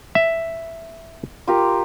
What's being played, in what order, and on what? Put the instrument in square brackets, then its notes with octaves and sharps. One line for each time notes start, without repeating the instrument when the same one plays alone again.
[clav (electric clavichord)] E5
[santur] F4 G4 A#4